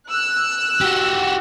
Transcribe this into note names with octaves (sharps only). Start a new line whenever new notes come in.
E6 F#6
F#4 G4